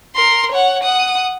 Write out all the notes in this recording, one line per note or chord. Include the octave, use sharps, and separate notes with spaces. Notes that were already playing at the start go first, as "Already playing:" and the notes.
A#4 C6
C#5 F#5
F#5 D#6